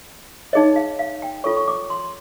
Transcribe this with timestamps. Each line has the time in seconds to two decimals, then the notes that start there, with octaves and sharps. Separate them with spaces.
0.53 D#4 G#4 C#5 D#5
0.76 F5
0.99 F5
1.22 G5
1.44 F4 A4 C#5 C#6
1.57 C#6
1.68 D6
1.90 C6